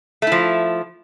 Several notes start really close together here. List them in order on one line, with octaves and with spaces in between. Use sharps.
A3 E4 F3